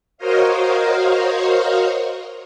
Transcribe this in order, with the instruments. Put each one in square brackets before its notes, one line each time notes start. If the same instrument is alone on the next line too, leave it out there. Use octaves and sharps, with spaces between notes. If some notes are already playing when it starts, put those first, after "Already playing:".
[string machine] F#4 A#4 C5 C#5 D#5 F5